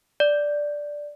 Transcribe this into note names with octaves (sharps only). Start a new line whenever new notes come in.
D5